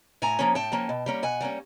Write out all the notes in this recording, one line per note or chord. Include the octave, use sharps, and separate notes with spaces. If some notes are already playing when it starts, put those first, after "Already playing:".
A2 G#5 A#5
F3 A#3 C#4
A2 G5 A5
F3 A#3 C#4
B2
G3 A#3 C#4
B2 F#5 G#5
G3 A#3 C#4